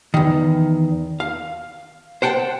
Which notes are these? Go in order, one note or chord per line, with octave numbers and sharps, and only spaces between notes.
E2 D#3
F5
C5 F#5 G5 A5